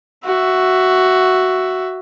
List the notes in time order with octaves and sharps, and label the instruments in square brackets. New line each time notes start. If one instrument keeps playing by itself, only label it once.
[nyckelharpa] F#4 E5